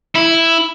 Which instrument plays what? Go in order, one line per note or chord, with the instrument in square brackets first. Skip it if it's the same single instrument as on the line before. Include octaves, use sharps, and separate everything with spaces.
[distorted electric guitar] E4